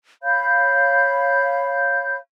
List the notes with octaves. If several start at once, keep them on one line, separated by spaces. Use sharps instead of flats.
C#5 F5 B5 G6